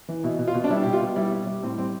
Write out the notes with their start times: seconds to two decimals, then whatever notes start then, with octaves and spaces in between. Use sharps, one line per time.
0.08 E3
0.24 B2 E4
0.39 B2
0.48 F4
0.54 B2
0.64 D4
0.70 G3 E4
0.83 B2 G4
0.93 F4
1.01 B2
1.16 G3 E4
1.32 G3
1.47 G3
1.63 A2 C4
1.78 G3 C4